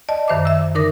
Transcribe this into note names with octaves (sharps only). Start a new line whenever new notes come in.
D5 D#5 A5
F#2 D#3 C5 E5 D6
E5 E6
D3 D#4 A#4 D6 A#6